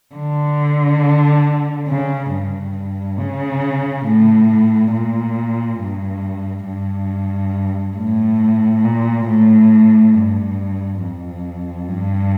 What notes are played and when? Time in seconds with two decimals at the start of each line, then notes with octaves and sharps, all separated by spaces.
0.15 D3
1.89 C#3
2.31 G2
3.19 C#3
4.06 A2
4.92 A#2
5.80 G2
6.66 G2
7.97 A2
8.84 A#2
9.27 A2
10.14 G2
11.01 F2
11.88 G2